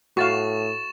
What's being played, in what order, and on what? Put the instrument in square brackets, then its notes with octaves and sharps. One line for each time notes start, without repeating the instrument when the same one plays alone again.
[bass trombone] A2 [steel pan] F#4 F5 [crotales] C#6 A6 E7